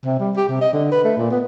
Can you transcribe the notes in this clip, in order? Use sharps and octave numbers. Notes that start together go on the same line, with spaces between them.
C3
G3
G4
C3
D#5
D3
B4
A3
A#2
B3